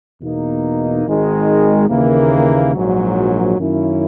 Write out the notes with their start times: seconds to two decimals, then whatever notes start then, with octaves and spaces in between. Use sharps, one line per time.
0.21 E2 B2 A#3 D#4
1.05 G#1 G#2 D#3 G#3
1.89 D#2 C#3 E3 A#3
2.74 A#1 G#2 F#3
3.58 F#2 D#3 A#3 C#4 E4